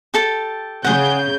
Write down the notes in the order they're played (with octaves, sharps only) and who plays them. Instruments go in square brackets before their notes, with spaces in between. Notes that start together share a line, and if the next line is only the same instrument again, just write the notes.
[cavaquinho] G4 A4 A5
[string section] C#3 G6 [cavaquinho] G#4 F#5